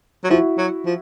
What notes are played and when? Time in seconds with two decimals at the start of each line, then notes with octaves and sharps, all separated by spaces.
0.24 F#3
0.30 F3 E4 F#4
0.58 F#3
0.86 F3